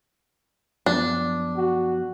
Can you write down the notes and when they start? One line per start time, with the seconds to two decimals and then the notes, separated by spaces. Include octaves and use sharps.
0.86 F#2 F3 B3 D4
1.57 F#4